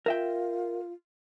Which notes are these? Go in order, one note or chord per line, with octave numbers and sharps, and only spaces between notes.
F4 A#4 E5 G5